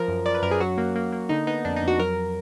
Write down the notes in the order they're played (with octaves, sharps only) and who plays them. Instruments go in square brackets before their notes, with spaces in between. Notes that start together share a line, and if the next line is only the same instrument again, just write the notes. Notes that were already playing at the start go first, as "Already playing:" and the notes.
Already playing: [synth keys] F3 A#4
F#2
F3 D5
B4
F#2 A#4
G#4
F#3 F#4
A#3
A#3
A#3
D3 D#4
B3 D#4
F2 D4
D#4
F2
F#4
F#3 A#4